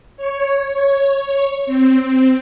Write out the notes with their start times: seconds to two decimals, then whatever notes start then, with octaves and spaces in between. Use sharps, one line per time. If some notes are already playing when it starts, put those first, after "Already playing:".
0.17 C#5
1.66 C4